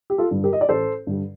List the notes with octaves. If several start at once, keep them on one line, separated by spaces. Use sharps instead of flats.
G4
F4 A4
G2 D3 G3
G4 A#4
D#5
D5
A1 A4 C5
G2 D3 G3